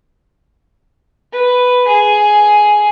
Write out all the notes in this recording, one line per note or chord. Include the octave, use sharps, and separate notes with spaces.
B4
G#4